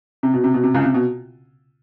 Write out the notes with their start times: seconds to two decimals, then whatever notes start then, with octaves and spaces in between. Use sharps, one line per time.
0.23 C3
0.34 B2
0.44 C3
0.54 B2
0.63 C3
0.74 C#2 C#3
0.85 C3
0.94 B2